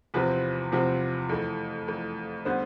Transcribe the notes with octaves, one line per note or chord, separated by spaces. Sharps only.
E2 C3 F3 C4 B4
E2 C3 F3 C4
F2 E3 A3
F2 E3 A3
D3 G3 B3 C5